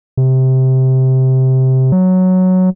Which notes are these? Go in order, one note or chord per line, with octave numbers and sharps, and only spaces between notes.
C3
F#3